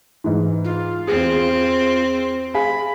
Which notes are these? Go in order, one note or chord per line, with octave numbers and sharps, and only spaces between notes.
G#2 E3
F4
E2 C4 G#4
G#4 F5 G#5 B5